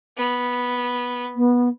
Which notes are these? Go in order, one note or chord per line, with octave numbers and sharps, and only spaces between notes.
B3
B3